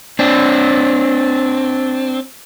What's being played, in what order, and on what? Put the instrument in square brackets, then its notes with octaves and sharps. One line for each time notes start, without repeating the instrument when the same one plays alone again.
[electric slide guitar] C4 D4